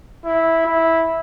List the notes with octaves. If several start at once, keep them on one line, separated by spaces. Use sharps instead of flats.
E4
E4